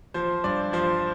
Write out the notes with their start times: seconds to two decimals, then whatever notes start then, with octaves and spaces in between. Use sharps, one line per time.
0.14 F3 C5
0.44 G2 D5
0.73 F3 C5